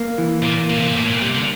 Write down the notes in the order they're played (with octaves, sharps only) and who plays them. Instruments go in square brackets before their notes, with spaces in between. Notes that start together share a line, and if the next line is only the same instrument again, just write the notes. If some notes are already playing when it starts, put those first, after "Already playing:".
Already playing: [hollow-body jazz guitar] A#3
E3
[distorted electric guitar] A#2 [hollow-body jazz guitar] A#3
[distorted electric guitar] A#2 [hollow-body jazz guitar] A#3
[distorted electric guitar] C3
A#2
[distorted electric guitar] A2 [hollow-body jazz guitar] A#3
[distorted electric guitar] A#2
[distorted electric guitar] C3 [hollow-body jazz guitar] G3
[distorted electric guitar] D3